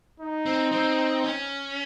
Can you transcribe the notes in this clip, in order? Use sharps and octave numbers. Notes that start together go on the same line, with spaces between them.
D#4
C4
C4
C#4